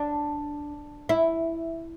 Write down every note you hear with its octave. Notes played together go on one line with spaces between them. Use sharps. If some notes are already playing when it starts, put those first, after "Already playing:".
Already playing: D4
E4